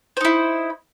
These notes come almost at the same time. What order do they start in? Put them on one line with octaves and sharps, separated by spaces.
C5 D#4 E4